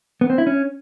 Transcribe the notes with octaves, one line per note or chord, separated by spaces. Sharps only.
B3
C4
E4
C#4